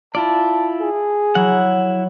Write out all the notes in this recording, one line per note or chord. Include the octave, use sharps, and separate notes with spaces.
E4 F4 D5 A5
G#4
F#3 E4 F#5